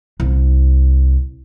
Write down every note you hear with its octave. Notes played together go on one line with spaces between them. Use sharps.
C2